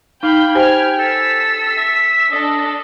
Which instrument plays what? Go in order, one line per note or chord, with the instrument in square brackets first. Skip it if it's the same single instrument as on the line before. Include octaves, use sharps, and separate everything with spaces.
[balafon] D#4 [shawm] F5 [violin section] G5 B5 G6
[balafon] G4 C5 G#5 [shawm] G5 [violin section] F6 G#6
[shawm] A4 [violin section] E6 B6
[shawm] E5
[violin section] D4 A4 [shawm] D#5